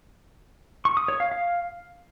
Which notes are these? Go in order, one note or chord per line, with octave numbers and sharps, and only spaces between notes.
C#6
D#6
C#5
F5
F5